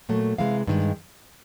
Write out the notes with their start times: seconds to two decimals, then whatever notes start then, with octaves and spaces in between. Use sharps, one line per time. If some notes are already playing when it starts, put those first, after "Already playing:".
0.09 A#2 F#3 A3
0.38 C3 E3 G#3 F5
0.67 G2 D#3 G#3